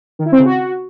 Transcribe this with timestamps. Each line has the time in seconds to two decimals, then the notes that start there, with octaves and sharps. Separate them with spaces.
0.19 D#3
0.26 E4
0.32 C4
0.39 C#3
0.45 F#4